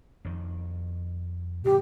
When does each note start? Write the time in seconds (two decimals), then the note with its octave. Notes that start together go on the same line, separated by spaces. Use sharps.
0.25 F2 D#3
1.65 A2 C#3 F3 G4